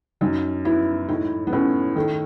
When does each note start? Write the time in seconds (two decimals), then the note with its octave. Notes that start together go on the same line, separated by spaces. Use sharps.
0.21 F#2 D#4
0.65 B3 E4
1.08 A2 D#4
1.47 B3
1.53 A2 C#4
1.96 D#3 A3